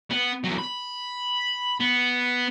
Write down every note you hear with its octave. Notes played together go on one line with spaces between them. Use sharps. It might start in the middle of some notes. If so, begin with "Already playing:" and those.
B3
E2 F#3
B5
B3